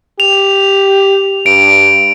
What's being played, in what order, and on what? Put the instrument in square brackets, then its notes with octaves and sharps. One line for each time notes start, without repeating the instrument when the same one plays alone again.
[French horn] G4 [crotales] F7
[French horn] G2 [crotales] D7